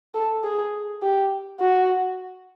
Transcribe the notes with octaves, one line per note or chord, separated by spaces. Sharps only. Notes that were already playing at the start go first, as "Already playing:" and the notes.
A4
G#4
G4
F#4